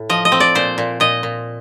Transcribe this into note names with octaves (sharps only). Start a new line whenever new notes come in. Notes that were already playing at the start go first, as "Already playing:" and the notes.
Already playing: A2
F3 D#5
D#5
C4
D5
A#2 C5
A#2
A#2 D#5
A#2